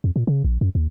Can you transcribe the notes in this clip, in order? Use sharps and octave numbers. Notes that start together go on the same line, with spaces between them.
F2
A#2
C#3
A#1
F#2
D#2